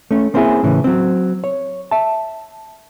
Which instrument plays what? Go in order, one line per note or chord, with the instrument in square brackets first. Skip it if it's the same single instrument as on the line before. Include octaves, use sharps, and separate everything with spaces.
[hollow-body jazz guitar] A3 C#4
A#3 C4 C#4 E4 G#4
A2 C#3 E3
F#3 C4
C#5
E5 A5